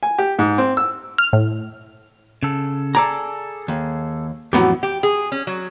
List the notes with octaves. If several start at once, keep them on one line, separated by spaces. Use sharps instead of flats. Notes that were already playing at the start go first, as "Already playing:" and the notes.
G#5
G4
G#2
C4
E6
F6
A2
C#3 A4
G#4 A4 D5 A#5
D#2
F2 A2 E3 F#3 B3 G4
G4
G#4
C#4
F#3